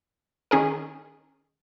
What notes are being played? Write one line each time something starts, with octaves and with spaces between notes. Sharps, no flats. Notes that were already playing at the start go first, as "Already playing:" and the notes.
D#3 C#4 G#4 A#4